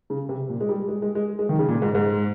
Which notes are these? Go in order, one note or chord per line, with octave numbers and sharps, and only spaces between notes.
C#3
C3
A#2
G#3
G3
G#3
G#3
G#3
G#3
D#3
C#3
A#2
G#2
G#2